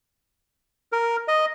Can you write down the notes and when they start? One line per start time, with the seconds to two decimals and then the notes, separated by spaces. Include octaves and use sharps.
0.92 A#4
1.28 D#5